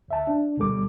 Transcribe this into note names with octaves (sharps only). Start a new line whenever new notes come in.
D2 E5 A5
D4
D2 B2 G3 A4 D6